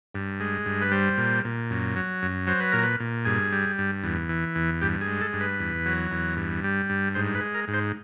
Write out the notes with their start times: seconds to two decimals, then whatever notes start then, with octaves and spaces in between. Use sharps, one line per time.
0.15 G2
0.40 G#3
0.66 G2
0.81 B4
0.91 G3 C5
1.18 A#2
1.45 A#2
1.71 F#2
1.96 F#3
2.22 F#2
2.47 F#3 C5
2.60 B4
2.72 A#2 A#4
2.83 B4
3.00 A#2
3.25 G2 G#4
3.52 G3
3.78 G2
4.04 E2
4.29 E3
4.55 E2
4.81 G2 G4
5.01 G#4
5.07 G#3
5.21 A4
5.33 G2
5.41 B4
5.60 E2
5.86 F#3
6.11 E2
6.37 G2
6.64 G3
6.90 G2
7.15 G#2 C5
7.35 B4
7.41 G#3
7.54 A#4
7.68 G#2
7.74 C5